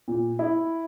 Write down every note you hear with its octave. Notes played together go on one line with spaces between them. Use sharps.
A#2
E4